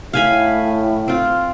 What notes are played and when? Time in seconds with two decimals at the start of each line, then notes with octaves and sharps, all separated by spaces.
0.13 A2 F5 G#5 B5
1.08 C4 F4